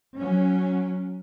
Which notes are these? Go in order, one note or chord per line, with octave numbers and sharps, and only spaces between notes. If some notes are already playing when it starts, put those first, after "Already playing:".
F#3 C#4